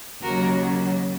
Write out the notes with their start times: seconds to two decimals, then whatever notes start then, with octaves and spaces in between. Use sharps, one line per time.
0.23 D#2 C#3 F#3 F#4 A#4